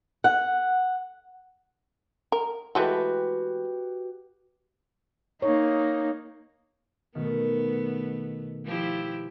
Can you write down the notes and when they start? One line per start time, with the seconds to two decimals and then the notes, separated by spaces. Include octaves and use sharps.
0.24 F#5
2.32 A#4
2.75 E3 G#3 A3 F#4 G4 B4
5.42 A#3 D#4 C#5
7.15 B2 D#3 A3 B3
8.65 F3 E4 G4